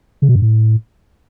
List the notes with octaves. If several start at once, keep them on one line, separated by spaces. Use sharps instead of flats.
C#3
B2
G2
A2